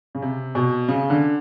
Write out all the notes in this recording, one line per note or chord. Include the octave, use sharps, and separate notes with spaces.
C#3
C3
B2
C#3
D3